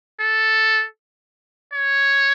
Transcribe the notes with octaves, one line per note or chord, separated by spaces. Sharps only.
A4
C#5